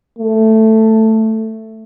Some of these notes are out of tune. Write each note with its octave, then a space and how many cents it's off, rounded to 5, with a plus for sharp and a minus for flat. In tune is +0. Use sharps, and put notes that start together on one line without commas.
A3 +5